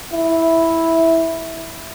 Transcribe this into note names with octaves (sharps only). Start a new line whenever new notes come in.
E4